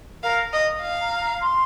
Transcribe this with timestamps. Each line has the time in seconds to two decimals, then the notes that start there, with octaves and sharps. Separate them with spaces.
0.23 A#4 F5
0.53 D#5
0.82 F5
1.01 A#5
1.21 A#5
1.41 C6